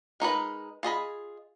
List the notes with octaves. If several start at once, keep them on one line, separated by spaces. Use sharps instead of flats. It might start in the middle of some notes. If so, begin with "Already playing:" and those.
G#3 D#4 A#4 B4
F4 G#4 D#5 B5